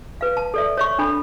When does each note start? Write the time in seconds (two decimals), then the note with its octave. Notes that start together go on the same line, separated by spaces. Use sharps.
0.21 B4 F5
0.37 A5
0.54 A4 D5 E5
0.77 C#5 E5 C#6
0.99 D4 A4 B5